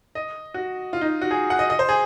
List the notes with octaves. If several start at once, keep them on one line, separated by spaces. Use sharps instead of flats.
D#5
F#4
F4
D#4
F#4
G#4
F#5
D#5
D#5
C5
G#4